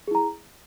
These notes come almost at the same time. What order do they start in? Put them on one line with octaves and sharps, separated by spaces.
G#4 E4 A#5